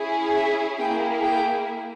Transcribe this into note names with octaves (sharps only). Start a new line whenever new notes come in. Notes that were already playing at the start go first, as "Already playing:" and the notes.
Already playing: C#4 E4 G#4
E5
A#3 E4 G#4 G5
G5